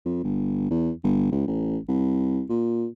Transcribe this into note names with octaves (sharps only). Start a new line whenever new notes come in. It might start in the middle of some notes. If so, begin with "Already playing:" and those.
F2
G1
E2
G1
C#2
A1
C2
A#2